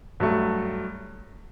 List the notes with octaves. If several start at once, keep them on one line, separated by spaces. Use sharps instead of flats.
G2 F#3 A3